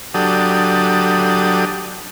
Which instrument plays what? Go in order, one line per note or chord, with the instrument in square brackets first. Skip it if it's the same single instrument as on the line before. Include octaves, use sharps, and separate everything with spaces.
[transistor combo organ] F#3 D4 G4 A4 D#6